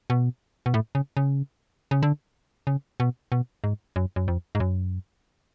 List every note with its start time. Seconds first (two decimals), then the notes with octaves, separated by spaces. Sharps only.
0.10 B2
0.66 B2
0.74 A2
0.95 C#3
1.17 C#3
1.91 C#3
2.03 D3
2.67 C#3
3.00 B2
3.32 B2
3.64 G#2
3.96 F#2
4.16 F#2
4.28 F2
4.55 G#2
4.60 F#2